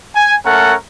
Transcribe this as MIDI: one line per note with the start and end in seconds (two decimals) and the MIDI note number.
0.15 0.35 80
0.45 0.74 57
0.45 0.74 61
0.45 0.74 69
0.45 0.74 70
0.45 0.74 78